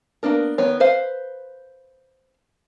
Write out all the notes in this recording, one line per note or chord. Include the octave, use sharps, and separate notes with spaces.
A#3 B3 D4 A#4
D#3 B3 C#5
B4 C5 F5